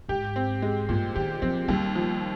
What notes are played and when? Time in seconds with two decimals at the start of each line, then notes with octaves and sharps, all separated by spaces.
0.09 G#2 G4
0.36 C4
0.62 G#3
0.89 G2 A#2
1.16 D#3 G4
1.42 F3 C4
1.68 D#2 G3
1.95 F3